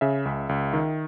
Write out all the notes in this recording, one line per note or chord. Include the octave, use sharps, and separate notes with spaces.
C#3 E5
C#2
C#2
D#3